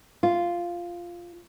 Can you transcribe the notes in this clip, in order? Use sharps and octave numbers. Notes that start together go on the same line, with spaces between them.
F4